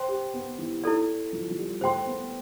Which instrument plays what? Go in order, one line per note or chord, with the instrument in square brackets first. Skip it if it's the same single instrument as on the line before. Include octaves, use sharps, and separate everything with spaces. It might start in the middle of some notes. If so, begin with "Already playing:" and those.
Already playing: [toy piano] C5 G5 C6
[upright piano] G4
B3
E3
[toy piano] E4 A4 D5
[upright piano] F3
F3
G3
[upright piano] A3 [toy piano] C5 G5 C6
[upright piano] B3